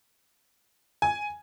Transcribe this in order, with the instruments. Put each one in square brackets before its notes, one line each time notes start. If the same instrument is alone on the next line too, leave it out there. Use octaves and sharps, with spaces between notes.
[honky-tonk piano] G#5